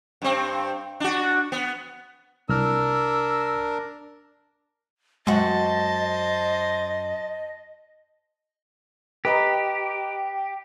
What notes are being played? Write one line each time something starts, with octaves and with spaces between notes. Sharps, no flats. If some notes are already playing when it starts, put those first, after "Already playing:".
G2 C4
D4 F#4
B3
C2 D4 A#4 E6 F6
F#2 G#3 F#4 C5 D#5 A5
G4 B4 D#5 A#5